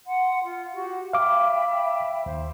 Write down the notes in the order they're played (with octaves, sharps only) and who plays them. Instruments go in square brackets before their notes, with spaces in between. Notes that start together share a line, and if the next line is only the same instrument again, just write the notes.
[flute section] F#5 C6
F4
F#4 G4 F#5
[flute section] E5 G5 B5 [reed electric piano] F5 D6
[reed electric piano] D#2 [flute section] C5